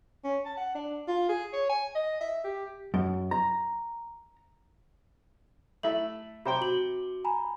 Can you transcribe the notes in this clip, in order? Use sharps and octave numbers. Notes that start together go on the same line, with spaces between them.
C#4
A5
F#5
D4
F4
G#4
C#5
G#5
D#5
E5
G4
F#2
A#5
A3 E4 E5 F#7
C3 C5 G5 A#5 B5
F#4 F#7
G#5 A#5 B5